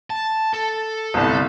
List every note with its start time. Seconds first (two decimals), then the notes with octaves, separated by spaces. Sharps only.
0.10 A5
0.54 A4
1.14 G1 C2